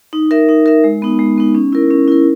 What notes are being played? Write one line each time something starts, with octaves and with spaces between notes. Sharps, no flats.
D#4
A#4 E5
D#4
A#4 E5
G#3
B3 D#4
G#3
B3 D#4
C#4
E4 A#4
C#4
E4 A#4